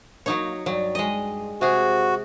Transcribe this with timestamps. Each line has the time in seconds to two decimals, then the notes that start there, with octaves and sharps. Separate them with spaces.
0.26 F#3 A#3 D#4 C#5
0.66 G2 F#3 D5
0.95 G#3 D#5
1.61 C3 C4 F#4 G#4